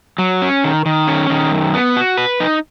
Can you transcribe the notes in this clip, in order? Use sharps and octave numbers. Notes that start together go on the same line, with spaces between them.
F#3
C#4
D#3
D#3
C#4
D#3
F#2
B3
F#4
B4
D#4